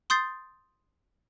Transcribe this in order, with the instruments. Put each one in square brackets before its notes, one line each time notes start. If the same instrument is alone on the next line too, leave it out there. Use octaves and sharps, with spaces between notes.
[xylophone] C6 D#6 G6 A6 C7